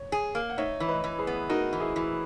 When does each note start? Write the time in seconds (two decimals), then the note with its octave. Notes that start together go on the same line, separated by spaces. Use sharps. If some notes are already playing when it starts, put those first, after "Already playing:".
Already playing: C#5
0.12 G#4
0.35 A#3
0.50 F#5
0.58 D#4 C#5 E5
0.80 E3
0.88 B4 D#5
1.04 E3
1.19 G#4 B4
1.27 B3
1.50 D#4 F#4 A#4
1.73 E3
1.80 E4 G#4
1.96 E3